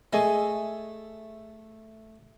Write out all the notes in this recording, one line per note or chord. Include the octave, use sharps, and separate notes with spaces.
A3 G#4 D#5